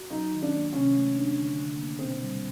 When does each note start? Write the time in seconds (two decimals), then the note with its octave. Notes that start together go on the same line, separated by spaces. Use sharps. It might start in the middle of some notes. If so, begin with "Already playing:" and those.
Already playing: F#4
0.10 F#3 D#4
0.32 D#3
0.42 D4
0.53 A#3
0.73 C3 C#4
0.94 A3
1.15 D4
1.36 D3
1.57 D3
1.78 A#3
1.99 B2 C4
2.20 G3